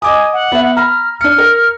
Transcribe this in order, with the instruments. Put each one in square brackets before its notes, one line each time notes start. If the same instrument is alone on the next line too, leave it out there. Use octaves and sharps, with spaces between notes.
[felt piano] D#5 D6 D#6 [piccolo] G#5
[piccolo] F#5
[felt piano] B3 E5
[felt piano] A#5 B5 [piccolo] F6
[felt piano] D4 C#7 [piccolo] F6
[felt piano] A#4